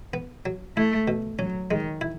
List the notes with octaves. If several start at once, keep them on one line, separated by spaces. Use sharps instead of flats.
B3
F#3
A3 E4
B2
F#3 C#4
D#3 G#3
E4